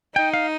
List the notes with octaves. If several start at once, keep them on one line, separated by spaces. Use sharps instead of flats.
D#4 G5
F5